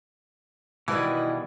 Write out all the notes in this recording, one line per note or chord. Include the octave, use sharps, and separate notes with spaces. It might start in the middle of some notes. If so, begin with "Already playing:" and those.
B2 D#3 E3 G3 E4 B4 D#5